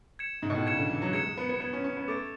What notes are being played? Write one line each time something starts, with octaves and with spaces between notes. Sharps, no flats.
G#6 C#7 E7
G#2
B2
A2
C#3 G#6 C#7 E7
D3
E3
F#3
G#3 G#6 C#7 E7
G#3
B3
B3
B3 G#6 C#7 E7
C#4
C#4
B3
A3 D6 A6 D7